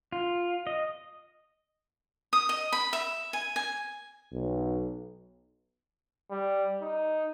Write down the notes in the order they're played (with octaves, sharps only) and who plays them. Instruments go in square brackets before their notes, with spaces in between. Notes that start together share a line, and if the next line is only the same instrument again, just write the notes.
[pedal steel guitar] F4
D#5
[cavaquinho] D#6
D#5
B5
E5
G#5
G#5
[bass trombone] B1
[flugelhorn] G3
D#4